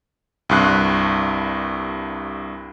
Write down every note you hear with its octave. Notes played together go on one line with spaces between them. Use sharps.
C2 G2 F#6